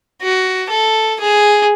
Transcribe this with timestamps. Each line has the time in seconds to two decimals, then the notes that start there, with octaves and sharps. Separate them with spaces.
0.22 F#4
0.70 A4
1.20 G#4